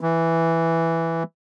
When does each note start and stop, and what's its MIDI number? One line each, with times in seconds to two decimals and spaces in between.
0.01 1.23 52